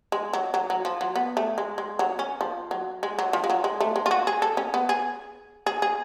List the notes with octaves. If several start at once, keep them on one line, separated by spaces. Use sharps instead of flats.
G#3
F#3
F#3
F#3
F3
F#3
B3
A3
G#3
G#3
F#3
C#4
F3
F#3
G#3
F#3
F3
G#3
F#3
G#3
A3
G#3
F4
F#4
G#4
A4
C#4
B3
G#4
G#4
G#4